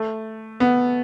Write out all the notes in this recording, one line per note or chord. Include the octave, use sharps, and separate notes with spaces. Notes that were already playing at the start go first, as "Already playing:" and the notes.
Already playing: A3
B3